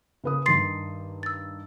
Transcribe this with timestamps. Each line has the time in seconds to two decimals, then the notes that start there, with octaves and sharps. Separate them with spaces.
0.24 C#3 B4 D#6
0.46 G2 D#3 C6 A6 C7
1.23 E6 A6